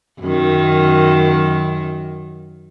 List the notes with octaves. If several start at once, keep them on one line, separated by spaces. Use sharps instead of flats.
F#2 D#3